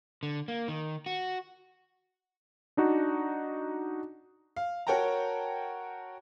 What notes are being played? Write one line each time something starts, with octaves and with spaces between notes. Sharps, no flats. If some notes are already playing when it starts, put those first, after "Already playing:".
D3
A#3
D#3
F#4
D4 D#4 F#4
F5
F#4 A#4 C#5 G5 A5 A#5